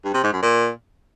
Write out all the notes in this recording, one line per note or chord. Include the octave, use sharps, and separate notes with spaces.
G2
C3
G#2
F#2
A#2